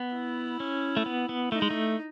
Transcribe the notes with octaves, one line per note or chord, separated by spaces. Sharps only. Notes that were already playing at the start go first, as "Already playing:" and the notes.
Already playing: B3
E4
C#4
A3
B3
B3
A3 D#4
G#3
A3